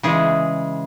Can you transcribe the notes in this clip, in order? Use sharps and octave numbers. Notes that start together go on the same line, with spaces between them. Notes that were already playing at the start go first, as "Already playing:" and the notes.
C#3 E3 G#3 G#4